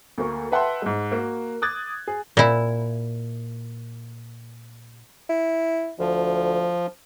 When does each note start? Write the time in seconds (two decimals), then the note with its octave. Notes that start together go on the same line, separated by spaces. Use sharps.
0.18 D2 A#3 C#6
0.52 B4 E5 F#5 G5 A5 C6
0.82 G#2 G#3
1.12 A#3 F#4
1.62 D6 D#6 F#6 G#6 A6
2.07 G#4
2.37 A#2 E4
5.30 E4
5.99 D2 F3